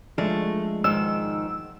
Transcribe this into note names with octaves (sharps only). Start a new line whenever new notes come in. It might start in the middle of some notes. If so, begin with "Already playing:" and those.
F3 G#3 A3 D4
G#2 D#3 E6